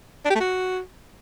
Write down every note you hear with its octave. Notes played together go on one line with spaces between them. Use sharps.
D4
G4
A3
F#4